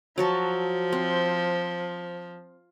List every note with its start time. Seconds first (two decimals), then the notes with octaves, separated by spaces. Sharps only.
0.18 F3 F#3 F#4 A5
0.92 C4